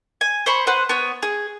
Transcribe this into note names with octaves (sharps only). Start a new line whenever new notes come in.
G#5
C5 B5 C#6
B4 C5 F#5
B3 C#5
G#4